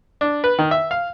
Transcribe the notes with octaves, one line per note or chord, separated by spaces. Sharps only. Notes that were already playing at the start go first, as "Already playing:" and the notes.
D4
B4
D#3
E5
F5